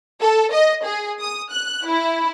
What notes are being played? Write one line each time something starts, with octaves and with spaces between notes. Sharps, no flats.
A4
D#5
G#4
D#6
F#6
E4